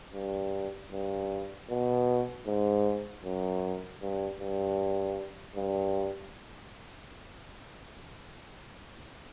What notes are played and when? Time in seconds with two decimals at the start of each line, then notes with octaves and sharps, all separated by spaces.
0.14 G2
0.92 G2
1.70 B2
2.46 G#2
3.24 F#2
4.02 G2
4.39 G2
5.56 G2